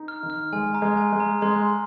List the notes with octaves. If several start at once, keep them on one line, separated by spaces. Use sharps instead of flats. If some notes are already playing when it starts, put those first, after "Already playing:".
Already playing: D#4
F6
D#3
F6
G#3 G#5
A#5
G#3
G#5
G#3
A#5
G#3 C6